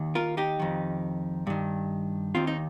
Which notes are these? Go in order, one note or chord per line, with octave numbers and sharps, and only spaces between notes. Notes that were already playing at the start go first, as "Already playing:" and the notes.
Already playing: D#2 D#3
F4 A#4
D#4 G4
F2 D#3
G2 D#3
D#2 D#3 C4 F4
D#4